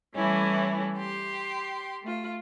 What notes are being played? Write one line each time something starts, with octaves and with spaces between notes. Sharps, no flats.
E3 G3 A3 C#4 E4
G4 C6
A3 F4